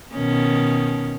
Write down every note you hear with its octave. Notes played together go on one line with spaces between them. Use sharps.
B2 D#3 C#4